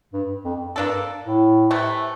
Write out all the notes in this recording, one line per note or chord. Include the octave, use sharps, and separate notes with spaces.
G2
F2
G2 A#3 D4 A4
A2
C3 E3 A3